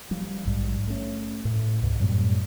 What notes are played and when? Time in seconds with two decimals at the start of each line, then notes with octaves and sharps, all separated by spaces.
0.11 F3 G3
0.45 A#1 G#2 C3 G3
0.87 A3 C#4
1.45 A2
1.82 C2 G2 B2
1.99 F#2 A2 G3 C4